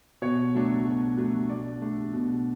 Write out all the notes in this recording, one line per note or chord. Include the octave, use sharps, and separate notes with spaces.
B2 C#5
F#3 A3 D4
B2
F#3 A3 D4
B2 D5
A3 D4
B2